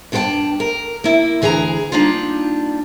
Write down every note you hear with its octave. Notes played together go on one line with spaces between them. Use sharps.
G2 D4 G4 C5 G5 A5
A#4
A#3 E4
D2 E3 G#4 A4 A#5
G3 A#3 D4 D#4 F4